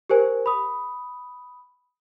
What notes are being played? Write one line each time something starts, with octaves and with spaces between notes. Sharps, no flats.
G4 A#4 C5 G#5
B5 D#6